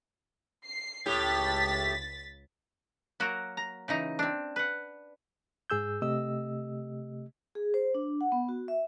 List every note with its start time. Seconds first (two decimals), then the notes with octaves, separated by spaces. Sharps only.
0.67 C7
1.06 C#2 A2 G4 A6 B6
3.20 F#3 A#3 F#4 A#4
3.57 A#5
3.88 C#3 E3 D#4 A#5
4.19 C4 D4
4.56 B4 F#5
5.70 G#2 G#4 E6 G6
6.02 C3 A3 G4 D#5 E6
7.55 G#4
7.74 C5
7.94 D4
8.21 F#5
8.32 B3
8.49 F#4
8.68 E5